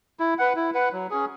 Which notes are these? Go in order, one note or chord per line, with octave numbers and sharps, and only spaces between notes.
E4
B4 F#5
E4
B4 F#5
F#3
C#4 G#4